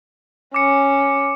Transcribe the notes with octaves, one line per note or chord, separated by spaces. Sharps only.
C#4 D6 C#7